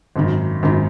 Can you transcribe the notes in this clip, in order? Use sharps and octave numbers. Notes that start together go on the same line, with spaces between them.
G#1 F#2 D#3
G#1 F#2 D#3